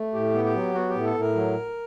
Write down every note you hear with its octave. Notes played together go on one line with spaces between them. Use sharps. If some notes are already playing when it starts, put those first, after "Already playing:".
Already playing: A3
A2 G4
B3
G4
F#3
B3 F#4
G4
A2
A4
A2
A#4
F#3